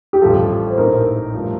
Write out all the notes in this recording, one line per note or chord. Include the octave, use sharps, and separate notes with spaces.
G4
A1 G2 F3 A4
C5
A#1 A2 A3 C4 D#4 A#4
G2 F3 A3